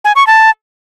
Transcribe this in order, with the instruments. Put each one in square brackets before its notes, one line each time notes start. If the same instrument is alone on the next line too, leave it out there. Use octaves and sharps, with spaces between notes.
[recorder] G#5
C#6
A5